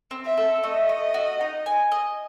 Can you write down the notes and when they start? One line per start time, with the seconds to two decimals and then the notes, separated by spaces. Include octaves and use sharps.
0.11 C4
0.25 E5
0.37 A4
0.63 A3 D#5
0.89 A3
1.14 F#4
1.41 D#4
1.66 G#5
1.92 D#5